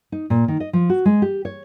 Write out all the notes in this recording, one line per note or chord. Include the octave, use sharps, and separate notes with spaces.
D#4
A#2
D#3
D#5
F3
F#4
G#3
G4
C#5